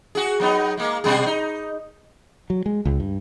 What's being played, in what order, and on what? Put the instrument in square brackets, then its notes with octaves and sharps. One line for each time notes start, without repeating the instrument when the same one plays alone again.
[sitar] F#4 G#4
F#3 B3 D#4
G#3 A#3
B2 G3 G#4
D#4
[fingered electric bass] F#3
G#3
C#2
G2